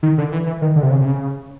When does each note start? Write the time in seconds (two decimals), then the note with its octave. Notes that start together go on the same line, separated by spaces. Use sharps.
0.03 D#3
0.18 D3
0.32 E3
0.46 E3
0.62 D#3
0.76 D3
0.83 C3
0.91 C#3
1.01 C3
1.05 C#3